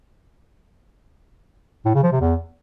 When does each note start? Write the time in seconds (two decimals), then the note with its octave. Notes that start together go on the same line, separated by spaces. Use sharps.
1.85 A2
1.94 C#3
2.03 F3
2.12 C3
2.21 E2